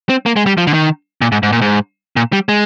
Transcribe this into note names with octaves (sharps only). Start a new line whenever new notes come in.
C4
A#3
G#3
G3
F3
D3
D#3
A#2
G#2
G#2
A#2
G#2
A#2
G3
G#3